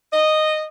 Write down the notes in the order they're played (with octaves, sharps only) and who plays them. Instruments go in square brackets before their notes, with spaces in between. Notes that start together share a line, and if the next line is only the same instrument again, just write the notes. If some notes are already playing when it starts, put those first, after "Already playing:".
[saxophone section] D#5